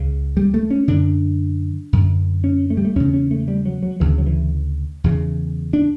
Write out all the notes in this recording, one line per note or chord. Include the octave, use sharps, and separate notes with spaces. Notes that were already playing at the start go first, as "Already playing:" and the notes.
Already playing: C#2 C#3
G3
A3
C#4
F#2 D3 D4
F#2 D3
C#4
A3
G3
A3
E2 C#3 C#4
C#4
A3
G3
F#3
F#3
D2 C#3 E3
F#3
E3
E2 C#3
D4